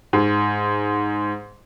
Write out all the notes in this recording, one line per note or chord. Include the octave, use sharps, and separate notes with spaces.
G#2